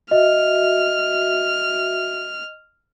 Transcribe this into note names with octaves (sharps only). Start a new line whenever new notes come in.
F#4 D#5 E5 F6